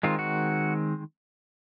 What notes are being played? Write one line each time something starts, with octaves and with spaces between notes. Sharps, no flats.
D#3 G#3 C4 F4
F#4